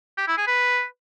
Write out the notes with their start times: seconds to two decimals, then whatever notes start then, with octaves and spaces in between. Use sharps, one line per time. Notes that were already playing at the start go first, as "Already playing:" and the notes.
0.18 G4
0.28 E4
0.37 G#4
0.47 B4